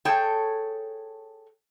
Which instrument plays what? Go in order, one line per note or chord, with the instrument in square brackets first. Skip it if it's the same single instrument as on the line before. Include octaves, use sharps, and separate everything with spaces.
[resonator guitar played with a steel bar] G#4 A4 C#5 G5 A5